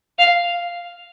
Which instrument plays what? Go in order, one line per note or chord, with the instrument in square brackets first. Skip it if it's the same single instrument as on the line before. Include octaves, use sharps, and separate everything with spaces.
[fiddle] F5